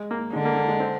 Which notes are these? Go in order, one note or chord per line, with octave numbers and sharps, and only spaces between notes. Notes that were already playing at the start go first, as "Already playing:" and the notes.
Already playing: G#3
A#3
D3 G#3
A#3
A#3
G#3
C4